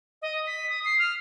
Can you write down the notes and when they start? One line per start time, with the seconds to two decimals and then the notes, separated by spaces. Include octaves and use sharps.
0.22 D#5
0.46 B6
0.70 D#6
0.85 C7
0.99 F6